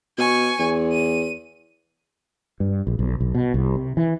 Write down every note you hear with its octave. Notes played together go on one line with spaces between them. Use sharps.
B2 G#5 C#6
E2
D#7
G2
A#1
B1
B1
B2
C2
C3
E3